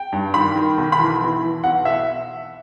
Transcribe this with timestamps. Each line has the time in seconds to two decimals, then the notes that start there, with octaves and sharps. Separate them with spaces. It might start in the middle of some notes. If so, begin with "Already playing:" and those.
Already playing: G5
0.13 G2
0.34 D#3 B5
0.56 D#3
0.78 B1
0.92 B5
0.99 E3
1.21 E3
1.42 E3
1.64 B1 F#5
1.85 E5